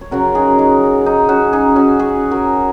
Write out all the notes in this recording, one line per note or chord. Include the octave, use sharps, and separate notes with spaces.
C#5
C#3 F#3 F#4 A#4
D#4 G#4
D#4
D#4
C#4 F#4
D#4 G#4
C#4 F#4
G#4 C#5
F#4 A#4